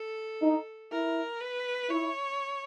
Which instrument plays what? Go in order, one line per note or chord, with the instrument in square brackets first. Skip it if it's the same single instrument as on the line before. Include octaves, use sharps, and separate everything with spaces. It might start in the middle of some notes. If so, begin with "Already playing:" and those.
Already playing: [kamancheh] A4
[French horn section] D#4
[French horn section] E4 [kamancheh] A#4
[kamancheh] B4
[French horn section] E4 [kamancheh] C#5